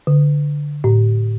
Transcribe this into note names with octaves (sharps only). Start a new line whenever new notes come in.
D3
A2